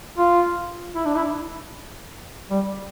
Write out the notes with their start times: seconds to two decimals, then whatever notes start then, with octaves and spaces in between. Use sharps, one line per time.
0.18 F4
0.95 E4
1.05 D4
1.15 E4
2.50 G3